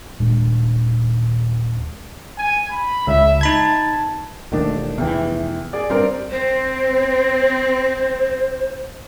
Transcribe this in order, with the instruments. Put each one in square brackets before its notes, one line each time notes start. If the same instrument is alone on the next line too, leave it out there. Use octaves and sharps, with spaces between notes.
[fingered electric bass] D#1 A#2 G#3 D4
[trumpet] G#5
B5
[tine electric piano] C#2 [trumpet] E5
[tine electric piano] D#4 B5 G#6 [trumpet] A5
[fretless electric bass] E1 D#2 [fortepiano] D#3 A3 D4
[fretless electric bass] F1 E3 [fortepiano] E2 G5
[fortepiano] G#4 D5
[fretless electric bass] G2 [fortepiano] C4 A#4 D5
[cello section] C4 [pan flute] C5